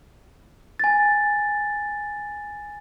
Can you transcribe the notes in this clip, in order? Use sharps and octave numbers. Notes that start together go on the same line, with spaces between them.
G#5 A6